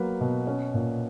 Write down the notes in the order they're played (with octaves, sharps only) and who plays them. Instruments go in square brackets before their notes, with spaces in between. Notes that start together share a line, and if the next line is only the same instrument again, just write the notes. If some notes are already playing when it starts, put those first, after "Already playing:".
Already playing: [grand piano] F#3 A#3 B4
B2
C#4
A#2